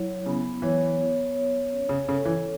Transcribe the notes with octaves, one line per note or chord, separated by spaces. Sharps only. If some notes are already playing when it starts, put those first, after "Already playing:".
Already playing: F#3 E4 C#5
C#3 B3
E3 C#5
B3
C#5
C#4
C#3
C#3 A4
E3